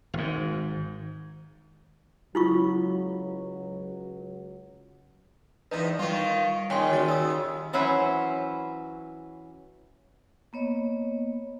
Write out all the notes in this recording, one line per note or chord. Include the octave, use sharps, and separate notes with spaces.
G#1 G#2
C#2 F#3 E4 F4 C#6
E2 G#2 D#4 B4
D#3 G3 F4 C#6
D#2 A#2 C#3 G5 G#5 C6
D#3 F#4 A6
D#6 E6
E3 F#3 C#4 E4 B4 C5
A#3 B3 C#5 D#5